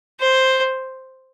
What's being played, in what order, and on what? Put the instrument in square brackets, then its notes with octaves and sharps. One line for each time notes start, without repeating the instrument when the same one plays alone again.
[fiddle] C5